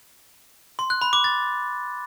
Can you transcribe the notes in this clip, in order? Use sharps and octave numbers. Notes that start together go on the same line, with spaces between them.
C6
F#6
B5
D6
A6